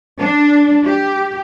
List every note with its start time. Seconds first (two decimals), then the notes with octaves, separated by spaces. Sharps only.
0.19 D4
0.86 G4